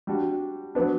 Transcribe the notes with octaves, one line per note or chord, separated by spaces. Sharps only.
G3 D4 F#4
F#3 B3 D4